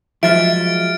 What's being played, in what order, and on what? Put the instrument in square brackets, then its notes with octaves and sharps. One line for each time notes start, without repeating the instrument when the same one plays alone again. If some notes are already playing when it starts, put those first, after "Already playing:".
[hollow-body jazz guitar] F3 F#3 G#3 [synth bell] E5 [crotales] F6 A6 D7